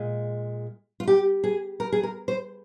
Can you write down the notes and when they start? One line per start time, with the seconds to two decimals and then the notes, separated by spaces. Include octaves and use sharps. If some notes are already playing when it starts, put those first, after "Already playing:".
Already playing: A#2 G#3
1.00 F4
1.07 G4
1.44 G#4
1.80 A#4
1.92 G#4
2.03 A#4
2.28 C5